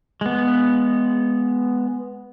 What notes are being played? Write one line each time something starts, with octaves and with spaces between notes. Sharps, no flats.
G#3 B3